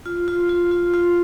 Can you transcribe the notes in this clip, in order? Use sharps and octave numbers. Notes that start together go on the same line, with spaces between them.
F4
F4
F4
F4
F4